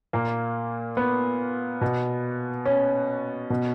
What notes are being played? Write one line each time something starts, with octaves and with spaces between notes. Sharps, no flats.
A#2 A#3
B3
B2
C#4
B2